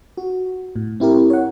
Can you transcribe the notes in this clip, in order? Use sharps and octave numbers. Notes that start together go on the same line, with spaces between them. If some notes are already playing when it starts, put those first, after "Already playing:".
F#4
A2
C4 E4 G4 A#4
C#5 F#5